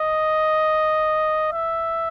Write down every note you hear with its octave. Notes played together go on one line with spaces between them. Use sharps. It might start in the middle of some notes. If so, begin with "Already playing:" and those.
Already playing: D#5
E5